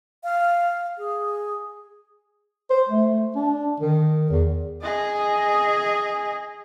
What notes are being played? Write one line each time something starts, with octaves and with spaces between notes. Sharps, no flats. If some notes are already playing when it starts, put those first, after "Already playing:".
F5
G#4
C5
A3
D4
D#3
E2
G#4 D#5